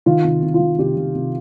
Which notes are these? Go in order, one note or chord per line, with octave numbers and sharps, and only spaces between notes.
D#3 F4
C2
C2
F4
D#3
C2 G4
D#3
C2